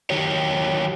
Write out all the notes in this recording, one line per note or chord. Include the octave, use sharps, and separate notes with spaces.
D#3 F#3 G4 C#5